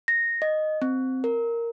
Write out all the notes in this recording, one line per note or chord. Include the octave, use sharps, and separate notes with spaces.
A#6
D#5
C4
A#4